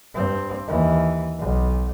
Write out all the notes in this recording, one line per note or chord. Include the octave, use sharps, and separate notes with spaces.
G2 C4
D#2 E3
B1